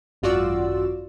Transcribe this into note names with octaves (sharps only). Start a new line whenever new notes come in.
G#1 F#2 F4 F#4 D5 E6